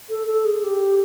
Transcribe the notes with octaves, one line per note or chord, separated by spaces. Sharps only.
A4
A4
G#4
G4